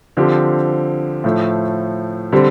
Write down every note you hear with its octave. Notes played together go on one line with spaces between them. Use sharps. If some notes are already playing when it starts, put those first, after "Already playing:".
D3 F3 C4 G4
A2 F3 A3
D3 G3 C4